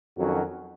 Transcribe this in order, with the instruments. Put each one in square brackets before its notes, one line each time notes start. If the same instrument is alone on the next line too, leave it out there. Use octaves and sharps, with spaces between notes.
[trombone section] F2 D#3 F#3 C#4 F#4